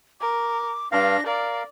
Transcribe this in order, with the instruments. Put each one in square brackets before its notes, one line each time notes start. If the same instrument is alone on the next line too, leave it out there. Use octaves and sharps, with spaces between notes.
[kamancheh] A#4 [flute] D6
[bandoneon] G2 F5 [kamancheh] D4 [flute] A#6
[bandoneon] A#4 [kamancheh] D5 [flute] F5